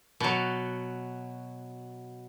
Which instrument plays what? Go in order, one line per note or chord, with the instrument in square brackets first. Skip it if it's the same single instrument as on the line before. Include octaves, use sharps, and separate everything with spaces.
[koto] B2 F#3